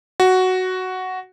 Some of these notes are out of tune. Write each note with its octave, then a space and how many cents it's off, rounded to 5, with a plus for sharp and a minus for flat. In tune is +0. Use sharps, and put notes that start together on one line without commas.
F#4 +5